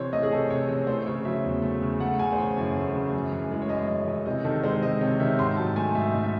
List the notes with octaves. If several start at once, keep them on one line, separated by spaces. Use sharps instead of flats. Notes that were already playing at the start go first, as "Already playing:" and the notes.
Already playing: C3 E3 C5 C#5
A3 D#5
G#4
C3 A4
C3 C#5
E3 C#5
A3 C5
C#3 C#5
F#3 E5
E2
A3
C#3
A3 F#5
C#3 G#5
C5
E3 C#5
F#2
A3
C#3
F#2
E3
G#3
C#5
F#2 D#5
F#2 D#5
E3
C3 D#5
D#3 A4
G#3 C5
C3 D#5
C3 C#5
D#3 E5
G#2 C6
F#3 A5
A3 G#5
G#2 E5
G#2
E5